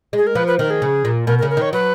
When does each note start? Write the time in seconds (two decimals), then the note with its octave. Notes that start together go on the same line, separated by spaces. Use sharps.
0.13 G#3 G#4
0.27 A#4
0.35 F3 B4
0.47 B4
0.59 D#3 A#4
0.70 G#4
0.82 C#3
1.05 A#2
1.27 B2 A#4
1.39 A#4
1.42 C#3
1.50 A#4
1.57 D#3 C#5
1.73 F#3 B4